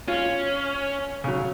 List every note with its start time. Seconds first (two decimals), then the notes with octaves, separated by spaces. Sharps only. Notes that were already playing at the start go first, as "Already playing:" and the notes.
0.08 C#4 F4
1.24 C#3 F#3